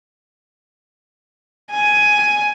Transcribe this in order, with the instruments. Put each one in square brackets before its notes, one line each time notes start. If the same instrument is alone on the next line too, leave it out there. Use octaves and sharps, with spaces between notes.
[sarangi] G#5